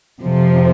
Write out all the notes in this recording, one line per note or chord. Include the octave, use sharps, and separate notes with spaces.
F2 C3 F3